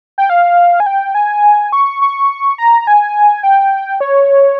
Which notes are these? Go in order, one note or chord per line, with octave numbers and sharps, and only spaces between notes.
G5
F5
G#5
G5
G#5
C#6
C#6
A#5
A#5
G#5
G5
C#5